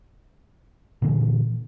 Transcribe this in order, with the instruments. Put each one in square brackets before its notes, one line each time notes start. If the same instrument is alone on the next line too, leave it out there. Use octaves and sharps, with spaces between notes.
[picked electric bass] A#2 D3 E3